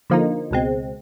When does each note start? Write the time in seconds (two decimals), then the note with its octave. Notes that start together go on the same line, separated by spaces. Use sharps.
0.10 D3 F3 A#3 D#4
0.51 C#2 B2 G#3 C4